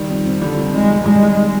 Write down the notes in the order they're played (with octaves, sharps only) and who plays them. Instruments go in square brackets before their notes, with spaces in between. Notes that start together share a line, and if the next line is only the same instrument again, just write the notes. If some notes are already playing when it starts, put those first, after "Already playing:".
Already playing: [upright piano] D#3 G3
F2
C3
[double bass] D3 [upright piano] G3
[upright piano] D#3
[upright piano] F2 [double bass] G#3
[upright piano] C3
[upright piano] G3 [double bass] G#3
[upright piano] D#3